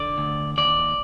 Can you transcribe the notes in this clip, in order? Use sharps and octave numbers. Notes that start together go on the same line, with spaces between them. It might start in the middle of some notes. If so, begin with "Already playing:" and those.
Already playing: D3 D5
D2
D#2 D5